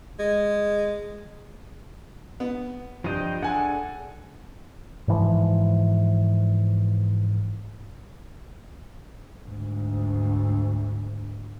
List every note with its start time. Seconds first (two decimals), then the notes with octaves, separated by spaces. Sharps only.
0.19 G#3
2.40 B3
3.04 G2 F3 D#5 G5
3.43 D4 G#4 A4 F#5 G#5
5.08 G#2 E3 F3
9.45 D2 G#2